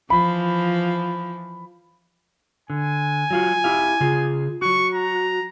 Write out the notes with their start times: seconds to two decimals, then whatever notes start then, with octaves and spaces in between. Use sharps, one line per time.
0.10 E3 F3 B5
2.70 D3 G#5
3.31 F#3 F4 F#4
3.64 E4 G4 F5
4.00 C#3 F4 G#4
4.62 F#3 F#4 C#6
4.94 A#5